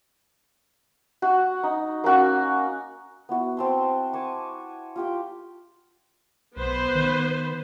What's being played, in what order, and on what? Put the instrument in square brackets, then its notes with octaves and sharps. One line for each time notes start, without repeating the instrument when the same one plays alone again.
[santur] F#4
D#4
A#3 C#4 F#4
B3 E4 F#4
C4 A5 C6
G#5 A5 C#6 D6
F4 G4 G5
[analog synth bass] B1 [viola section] B3 B4 C5
[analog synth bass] D#3